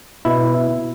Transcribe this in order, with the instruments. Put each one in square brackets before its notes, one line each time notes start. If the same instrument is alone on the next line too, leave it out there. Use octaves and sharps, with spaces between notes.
[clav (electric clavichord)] B2 E4